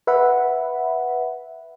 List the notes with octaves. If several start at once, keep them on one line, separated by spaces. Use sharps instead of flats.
B4 E5 F#5 B5